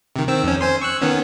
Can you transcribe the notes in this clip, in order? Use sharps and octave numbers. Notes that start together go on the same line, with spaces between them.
C3 D#3
D#3 C4 E6
F2 C#4
C5 G#5 C6
C#6 E6 F#6
D#3 B3 C#4